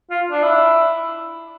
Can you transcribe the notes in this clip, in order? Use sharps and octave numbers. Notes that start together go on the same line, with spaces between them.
F4
D4
E4